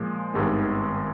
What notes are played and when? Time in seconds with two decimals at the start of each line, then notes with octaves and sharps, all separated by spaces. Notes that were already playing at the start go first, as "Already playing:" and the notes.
Already playing: A#2 F3 G#3
0.34 G#1 G2 D#3 G#3 B3